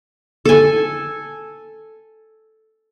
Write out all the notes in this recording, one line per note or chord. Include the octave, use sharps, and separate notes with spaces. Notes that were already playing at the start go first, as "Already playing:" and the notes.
A4 G#5